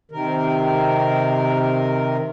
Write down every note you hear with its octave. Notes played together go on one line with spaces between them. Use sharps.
C3 D#3 A#4